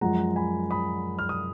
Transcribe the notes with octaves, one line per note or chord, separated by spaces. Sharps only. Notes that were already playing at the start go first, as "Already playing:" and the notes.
F#2 F3 G#3 F#5 A#5
G#5 B5
B5 D#6
F6
D#6